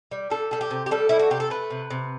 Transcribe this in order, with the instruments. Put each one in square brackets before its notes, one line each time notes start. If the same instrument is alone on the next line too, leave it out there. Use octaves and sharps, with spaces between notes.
[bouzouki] G3
G3 A4
G3 A4
G4
C3
G4
G3 A4
G3 E4
F#4
C3 G4
A4
A3 B4
C3
C3